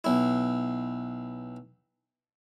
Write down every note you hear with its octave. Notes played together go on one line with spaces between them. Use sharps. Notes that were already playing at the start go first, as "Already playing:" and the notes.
B1 E4